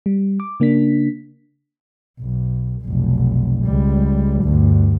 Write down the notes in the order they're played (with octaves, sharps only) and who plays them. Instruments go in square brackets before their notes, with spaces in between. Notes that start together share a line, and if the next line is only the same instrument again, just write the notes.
[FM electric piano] G3
D6
C#3 A#3 D4 B6
[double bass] B1
F1 B1
C#2 G3
D2 G2